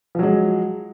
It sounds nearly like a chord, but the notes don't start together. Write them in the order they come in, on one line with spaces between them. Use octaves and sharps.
F3 F#3 G#3